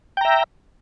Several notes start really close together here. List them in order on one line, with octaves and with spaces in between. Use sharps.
G5 A#5 E5